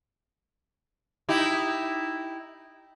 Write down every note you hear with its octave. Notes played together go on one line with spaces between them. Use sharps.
D#4 E4 G4